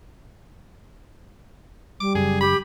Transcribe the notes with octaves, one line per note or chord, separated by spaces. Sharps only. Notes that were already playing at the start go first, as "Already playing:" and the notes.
G3 D6
F#1 F#2 G#4
G4 B5